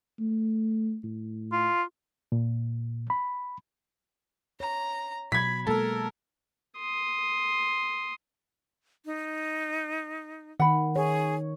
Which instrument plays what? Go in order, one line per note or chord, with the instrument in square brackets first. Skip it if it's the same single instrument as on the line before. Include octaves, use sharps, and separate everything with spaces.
[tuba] A3
A2
[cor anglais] F4
[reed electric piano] A#2
B5
[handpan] C#5 [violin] A#5
[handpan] B2 F#3 [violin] B5 [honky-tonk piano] G#6 B6
[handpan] G#3 A#3 [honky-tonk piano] A4 [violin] A#4
[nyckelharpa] C6 D#6
[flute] D#4
[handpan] D#3 [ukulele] F#5 B5
[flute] G#4 [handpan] C#5